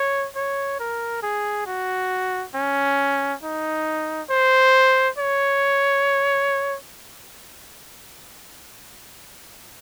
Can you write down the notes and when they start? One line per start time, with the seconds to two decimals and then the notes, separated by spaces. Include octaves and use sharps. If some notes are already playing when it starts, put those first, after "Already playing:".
Already playing: C#5
0.36 C#5
0.80 A#4
1.23 G#4
1.67 F#4
2.55 C#4
3.43 D#4
4.30 C5
5.19 C#5